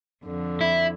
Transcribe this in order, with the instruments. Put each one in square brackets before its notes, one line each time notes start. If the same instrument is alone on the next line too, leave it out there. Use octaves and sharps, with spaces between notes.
[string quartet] F2 D3
[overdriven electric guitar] E4